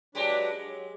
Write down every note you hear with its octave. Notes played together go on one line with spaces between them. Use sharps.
F#3 G#3 D4 G4 B4
F#3